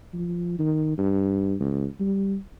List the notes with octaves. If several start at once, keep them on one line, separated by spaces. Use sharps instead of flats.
F3
D#3
G2
C#2
G3